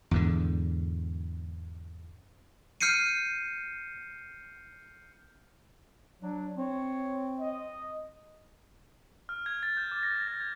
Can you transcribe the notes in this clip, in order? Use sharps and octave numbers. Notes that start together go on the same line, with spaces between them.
E2 G#2 D3
F6 G6 C7 C#7 D#7
F#3 D4
C4 C#5
D#5
F6
G#6
A6
G6
D6
A#6
G#6
A6
G#6